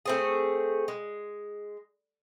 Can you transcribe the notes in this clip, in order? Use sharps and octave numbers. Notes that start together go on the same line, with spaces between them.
A3 C4 G#4
G#3